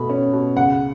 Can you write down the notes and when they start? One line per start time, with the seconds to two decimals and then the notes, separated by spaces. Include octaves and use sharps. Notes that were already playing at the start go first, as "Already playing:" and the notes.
Already playing: B2 A3 B5
0.10 C#4
0.33 B2
0.57 C#2 F#5